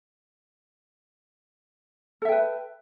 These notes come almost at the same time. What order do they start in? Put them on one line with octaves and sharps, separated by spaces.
A4 E5 G5 B4